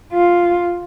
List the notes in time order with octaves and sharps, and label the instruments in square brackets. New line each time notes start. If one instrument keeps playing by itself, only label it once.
[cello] F4